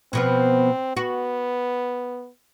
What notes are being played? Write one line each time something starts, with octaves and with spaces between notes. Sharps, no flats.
B2 F3 B3 C4
B3 F#4